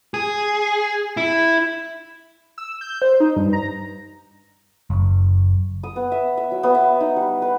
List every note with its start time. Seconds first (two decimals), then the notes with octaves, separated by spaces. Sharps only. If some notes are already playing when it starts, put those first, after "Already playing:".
0.14 G#4
1.17 E4
2.58 E6
2.81 G6
3.02 C5
3.20 D#4
3.36 G2
3.53 A#5
4.90 F#1
5.83 D#6
5.96 B3
6.12 E5
6.37 E5
6.51 F#3
6.63 B3
6.75 E5
7.01 D#4
7.16 G3
7.42 B4